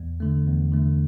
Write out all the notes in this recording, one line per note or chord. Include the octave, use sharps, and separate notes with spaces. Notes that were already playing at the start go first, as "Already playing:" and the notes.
Already playing: E2
D3 A3
E2
D3 A3